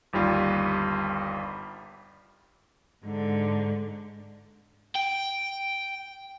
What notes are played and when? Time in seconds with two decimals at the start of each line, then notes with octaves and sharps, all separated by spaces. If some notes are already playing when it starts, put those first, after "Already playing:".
0.13 G1 D#2 G3 F4
3.03 G#2 D3
4.95 G5